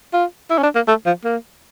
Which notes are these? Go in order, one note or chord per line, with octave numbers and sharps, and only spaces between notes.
F4
E4
C#4
D4
A#3
A3
F3
A#3